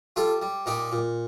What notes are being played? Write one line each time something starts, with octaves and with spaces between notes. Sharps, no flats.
G3 F4 A4
G3
A#2 D#4 G4
A#2